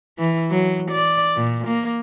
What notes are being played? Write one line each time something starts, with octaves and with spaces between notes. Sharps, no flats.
E3
F#3
D5
A#2
A#3